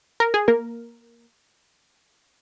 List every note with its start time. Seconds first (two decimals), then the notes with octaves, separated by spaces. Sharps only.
0.20 A#4
0.34 G#4
0.48 A#3 A#4